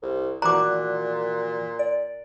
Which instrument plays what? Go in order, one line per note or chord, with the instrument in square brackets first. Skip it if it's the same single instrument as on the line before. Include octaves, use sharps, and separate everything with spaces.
[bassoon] C2
[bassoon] A#2 [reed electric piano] E3 F#4 D5 [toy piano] A#5 D6 [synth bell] F#6
[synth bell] D5